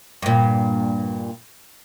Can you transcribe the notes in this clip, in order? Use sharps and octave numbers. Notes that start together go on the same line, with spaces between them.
G2 A#2